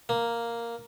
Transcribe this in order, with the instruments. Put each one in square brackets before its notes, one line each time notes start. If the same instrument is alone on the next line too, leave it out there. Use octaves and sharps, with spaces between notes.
[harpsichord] A#3